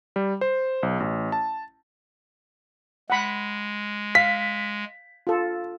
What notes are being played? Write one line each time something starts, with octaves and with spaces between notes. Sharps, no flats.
G3
C5
B1
A1
A5
G#3 F#5 B5
F5 B6
F4 A4